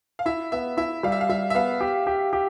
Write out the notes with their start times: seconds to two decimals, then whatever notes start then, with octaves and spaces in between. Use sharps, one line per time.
0.19 F5
0.26 E4 E5
0.52 B3 E5
0.77 E4 E5
1.03 G3 F5
1.12 E5
1.21 F5
1.29 G3 E5
1.50 E5
1.55 B3 F5
1.80 G4
2.07 G4
2.33 G4